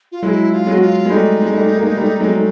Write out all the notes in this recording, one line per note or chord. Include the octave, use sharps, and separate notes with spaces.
F4
F#3 G#3 E4
F4
F#3 G#3
F#4
F4
G#3
G3 A3 D#4
G#3
G3 A3
G#3 A#3
G3 A3
A3
F#3 G#3
A3